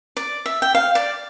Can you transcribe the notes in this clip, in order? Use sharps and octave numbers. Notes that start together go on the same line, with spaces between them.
D5
E5
G5
F5
D5